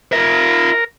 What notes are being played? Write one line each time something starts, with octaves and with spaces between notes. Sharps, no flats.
F4 A#4 E5